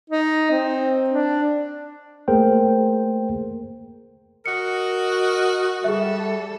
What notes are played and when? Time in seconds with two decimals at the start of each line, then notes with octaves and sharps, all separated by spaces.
0.10 D#4
0.51 C4
1.10 D4
2.28 A3 A#3 G#4 A#4 C5 G5
4.46 F#4 A#4 D#5 C#7
5.84 G3 G#4 A4 E5